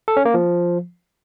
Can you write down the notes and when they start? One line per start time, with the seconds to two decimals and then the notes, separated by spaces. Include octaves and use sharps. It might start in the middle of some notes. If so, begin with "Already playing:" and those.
0.08 A4
0.17 C#4
0.25 A#3
0.34 F3